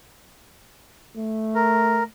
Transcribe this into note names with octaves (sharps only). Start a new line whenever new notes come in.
A3
A#4